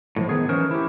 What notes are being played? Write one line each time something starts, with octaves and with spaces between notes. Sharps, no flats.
A2 E3 F3
D#3 B3 G#4
E3 C#4 A#4 C5
E4 G4